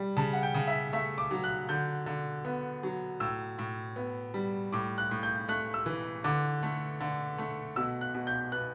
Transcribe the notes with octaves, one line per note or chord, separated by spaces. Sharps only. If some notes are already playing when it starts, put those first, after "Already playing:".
Already playing: G3
C#3 A5
F#5
G5
C#3
E5
A3 E5
D6
F#3
F#6
D3 G6
D3
B3
F#3
A2 E6
A2
B3
G3
A2 D6
F#6
A2
G6
A3 F#6
E6
E3
D3 D6
A3
D3
A3
B2 E6
F#6
B2
G6
B3 F#6